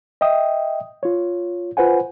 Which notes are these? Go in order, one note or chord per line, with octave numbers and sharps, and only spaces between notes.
D#5 E5 G5 D#6
F4 C#5
F4 B4 C5 F#5 G#5